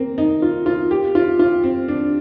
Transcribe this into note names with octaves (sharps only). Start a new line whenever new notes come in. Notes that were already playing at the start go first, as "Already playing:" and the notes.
Already playing: A#3 C4
D#4
F4
F4
G4
F4
F4
C4
D4